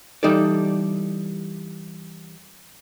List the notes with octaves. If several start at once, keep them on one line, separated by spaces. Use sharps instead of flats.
E3 G3 D#4 A4 D5